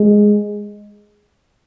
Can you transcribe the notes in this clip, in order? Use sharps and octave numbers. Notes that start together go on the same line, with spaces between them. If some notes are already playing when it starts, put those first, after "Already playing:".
Already playing: G#3